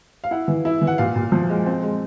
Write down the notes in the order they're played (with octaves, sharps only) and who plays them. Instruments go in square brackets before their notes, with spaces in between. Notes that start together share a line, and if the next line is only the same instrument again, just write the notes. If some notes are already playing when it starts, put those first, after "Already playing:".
[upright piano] F5
E4 F#5
E3
E4
E3
F#5
A#2 F5
A#2
F3
G#3
C4
G#3